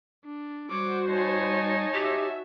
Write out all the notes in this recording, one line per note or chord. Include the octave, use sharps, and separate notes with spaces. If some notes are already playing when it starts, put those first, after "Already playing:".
D4
G3 F#4 C5 C#5 D6
D#4 C#5 G#5 A5
F#4 G4 E5